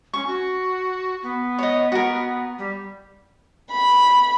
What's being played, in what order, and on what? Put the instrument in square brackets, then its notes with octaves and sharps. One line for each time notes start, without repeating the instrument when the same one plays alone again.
[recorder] C#4 [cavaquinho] C#6
[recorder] F#4
B3
[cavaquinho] C#5 D#5
F#4 A#4
[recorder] G3
[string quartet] B5